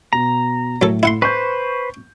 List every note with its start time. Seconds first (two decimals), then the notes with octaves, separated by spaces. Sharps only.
0.13 B2 A#5
0.82 A2 F#3 A4
1.03 E4 F#5 C6
1.22 B4 C5 C#6 G6